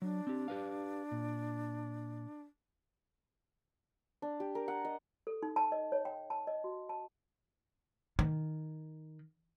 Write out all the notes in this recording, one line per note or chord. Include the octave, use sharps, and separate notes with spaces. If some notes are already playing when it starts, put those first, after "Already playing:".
F#3 D4
C4 G4
G4 B4 F5
A#2
D4
G4
A#4
F#5
D#5
A4
D#4
A5
D#5
C#5
G5
A5
D#5
F#4
A5
D#3